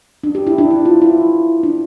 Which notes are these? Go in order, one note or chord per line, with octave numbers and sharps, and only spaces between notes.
D4
G4
E4
D4
E4
F4
E4
D4